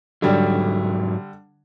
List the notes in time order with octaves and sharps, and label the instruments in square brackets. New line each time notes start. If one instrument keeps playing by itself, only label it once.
[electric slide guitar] G#2 F#3 [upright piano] D3 G3